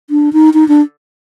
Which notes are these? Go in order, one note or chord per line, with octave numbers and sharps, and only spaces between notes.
D4
D#4
D#4
D4